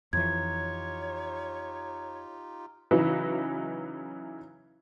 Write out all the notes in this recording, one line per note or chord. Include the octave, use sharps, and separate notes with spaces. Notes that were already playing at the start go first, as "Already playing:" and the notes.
F2 E3 D#4 F4 G4 C#5 G#6
C#3 E3 F#3 D#4 E4 B4